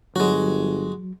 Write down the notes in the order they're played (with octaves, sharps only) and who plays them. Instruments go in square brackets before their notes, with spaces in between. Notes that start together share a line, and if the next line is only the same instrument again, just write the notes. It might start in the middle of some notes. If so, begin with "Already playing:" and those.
[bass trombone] G1 [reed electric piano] F#3 [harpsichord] G#3 F#4